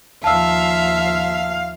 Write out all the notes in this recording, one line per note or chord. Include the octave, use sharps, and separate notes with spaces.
D#2 F3 E5 F5 A5 E6